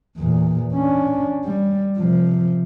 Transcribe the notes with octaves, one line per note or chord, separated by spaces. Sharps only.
E2 A#2
C#4 D4
G3
C3 F3